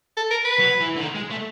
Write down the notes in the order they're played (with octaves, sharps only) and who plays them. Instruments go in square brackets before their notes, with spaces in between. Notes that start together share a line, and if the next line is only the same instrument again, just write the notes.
[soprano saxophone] A4
A#4
B4
[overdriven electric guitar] F#3
E3
D3
D#3
G#3
A3